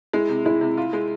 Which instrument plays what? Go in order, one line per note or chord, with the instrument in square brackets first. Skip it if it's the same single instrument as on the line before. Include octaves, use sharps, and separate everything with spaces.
[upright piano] G#3 [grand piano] E4
[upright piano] C3
[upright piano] G#3 [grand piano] E4
[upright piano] C3
F4
G#3